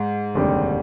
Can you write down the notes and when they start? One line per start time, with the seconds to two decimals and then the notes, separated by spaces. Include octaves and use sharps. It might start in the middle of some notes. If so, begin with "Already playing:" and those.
Already playing: G#2
0.34 F1 D#2 D3 G3 C4